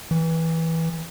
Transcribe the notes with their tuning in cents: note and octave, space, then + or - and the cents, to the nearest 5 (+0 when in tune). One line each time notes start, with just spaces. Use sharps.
E3 -15